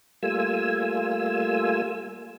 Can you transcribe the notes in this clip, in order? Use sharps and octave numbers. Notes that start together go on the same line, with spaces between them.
G3 A3 A#3 F4 G#5 E6